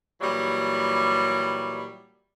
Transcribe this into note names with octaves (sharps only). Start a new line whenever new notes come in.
A#2 E3 F#3 G3